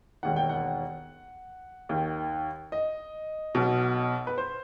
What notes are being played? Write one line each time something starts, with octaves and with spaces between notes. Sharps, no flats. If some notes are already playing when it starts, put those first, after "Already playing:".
E1 D#2 D#3 F#5
G5
F#5
D#2 D#3
D#5
B1 B2
B4
C5